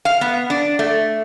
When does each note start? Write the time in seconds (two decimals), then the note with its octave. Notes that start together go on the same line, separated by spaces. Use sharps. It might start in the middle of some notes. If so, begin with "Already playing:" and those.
0.05 F5
0.21 B3
0.50 D4
0.79 A3